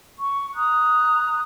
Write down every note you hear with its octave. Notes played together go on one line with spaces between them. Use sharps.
C#6
A#5 D#6 F#6